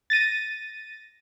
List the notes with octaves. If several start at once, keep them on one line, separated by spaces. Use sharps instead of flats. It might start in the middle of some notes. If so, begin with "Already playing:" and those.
A6 A#6 D#7